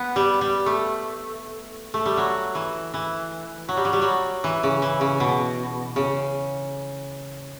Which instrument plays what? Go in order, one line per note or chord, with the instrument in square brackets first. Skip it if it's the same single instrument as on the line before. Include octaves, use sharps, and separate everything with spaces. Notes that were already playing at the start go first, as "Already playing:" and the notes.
Already playing: [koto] B3
G3
G3
A3
A3
G3
F#3
E3
E3
F#3
G3
F#3
G3
F#3
E3
C#3
E3
C#3
B2
C#3